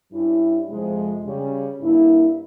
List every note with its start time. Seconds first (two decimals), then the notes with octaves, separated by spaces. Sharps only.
0.12 G2 G3 C#4 E4
0.68 F2 C3 F3 G#3
1.24 C#3 G3 C#4
1.80 G2 G3 A#3 E4